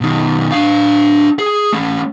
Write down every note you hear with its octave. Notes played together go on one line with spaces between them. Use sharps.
B2 D#3
D4 F5
G#4
A3 C#4